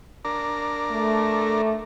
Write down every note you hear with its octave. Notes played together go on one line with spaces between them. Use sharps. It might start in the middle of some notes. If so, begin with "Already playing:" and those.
D4 A#4
A3